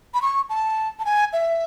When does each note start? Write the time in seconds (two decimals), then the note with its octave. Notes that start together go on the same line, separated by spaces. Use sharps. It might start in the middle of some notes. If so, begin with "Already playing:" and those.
0.14 B5
0.22 C#6
0.50 A5
0.99 A5
1.05 G#5
1.33 E5